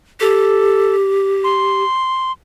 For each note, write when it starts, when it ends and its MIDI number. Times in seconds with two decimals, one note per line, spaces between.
0.21 1.83 67
0.21 0.95 69
1.44 2.32 84